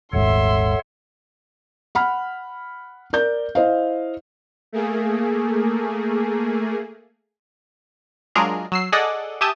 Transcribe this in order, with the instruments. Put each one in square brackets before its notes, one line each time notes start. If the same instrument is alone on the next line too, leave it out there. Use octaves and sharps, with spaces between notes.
[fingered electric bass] D#1 G#1 G#2 [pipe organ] A4 C#5 F#5 [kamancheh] E5 C6
[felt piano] F#5 B5 F6
A#4 D5 G6
E4 C5 D#5 F5
[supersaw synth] A3 A#3 G#4
[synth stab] F#3 G#3 D4 F4 G#4 A#4
F#3 E6 C7
G#4 A4 D5 D#5 F#5
G4 E5 G#5 A5 D#6 G6